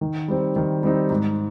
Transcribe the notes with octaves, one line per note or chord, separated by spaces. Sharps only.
D#3
G3 C4 D#4
D#3
G3 C4 D#4
G#2